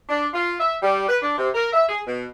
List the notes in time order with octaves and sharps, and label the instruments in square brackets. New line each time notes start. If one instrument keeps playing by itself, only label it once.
[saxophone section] D4
F4
E5
G3
B4
D4
C3
A#4
E5
G#4
B2